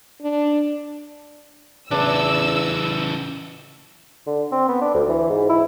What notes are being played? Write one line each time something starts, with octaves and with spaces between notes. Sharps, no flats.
D4
E2 C#3 E3 D4 E6
D3
C4
B3
D4
D2
E3
G#2
E4